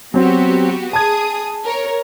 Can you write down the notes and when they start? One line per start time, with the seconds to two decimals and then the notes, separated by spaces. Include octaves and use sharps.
0.14 F#3 B3 C4 F#4 G4
0.93 G#4 A5 D#6 G#6
1.65 A#4 C#5